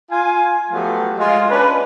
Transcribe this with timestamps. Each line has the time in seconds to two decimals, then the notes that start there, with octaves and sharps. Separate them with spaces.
0.11 F4 G#5
0.72 F3 F#3 A3 B3 F4 G4
1.19 G#3 F4
1.50 A#3 C#4 D4 B4